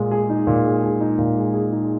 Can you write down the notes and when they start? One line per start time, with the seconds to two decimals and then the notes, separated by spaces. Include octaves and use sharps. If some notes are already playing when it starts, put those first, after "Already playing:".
Already playing: A#2 G#3
0.11 G#4
0.29 D#4
0.47 A#2
0.65 G#3
0.83 G#4
1.00 D#4
1.18 A#2
1.36 G#3
1.54 G#4
1.72 D#4